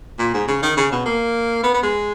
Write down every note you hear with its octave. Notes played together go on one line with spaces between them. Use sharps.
A#2
G#2
C#3
D#3
C#3
B2
A#3
B3
B3
G#3